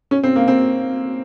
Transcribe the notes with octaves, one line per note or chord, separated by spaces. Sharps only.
C#4
C4
A#3
C4